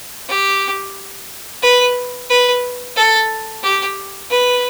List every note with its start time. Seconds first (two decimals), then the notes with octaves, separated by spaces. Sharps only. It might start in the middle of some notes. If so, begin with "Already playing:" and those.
0.28 G4
1.62 B4
2.30 B4
2.96 A4
3.63 G4
4.30 B4